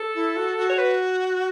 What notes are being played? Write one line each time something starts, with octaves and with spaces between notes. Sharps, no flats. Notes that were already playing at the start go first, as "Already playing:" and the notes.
Already playing: A4
E4
F#4
F#4
C#5
B4